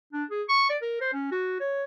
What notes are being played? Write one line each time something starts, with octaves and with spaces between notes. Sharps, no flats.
D4
G#4
C#6
D5
A#4
C5
C#4
F#4
C#5